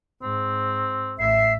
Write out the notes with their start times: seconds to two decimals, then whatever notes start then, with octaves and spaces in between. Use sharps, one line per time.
0.22 G#2 C4
1.19 A1 E5 C7